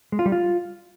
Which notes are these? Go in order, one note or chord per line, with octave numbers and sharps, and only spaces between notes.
G#3
F4
G3
F4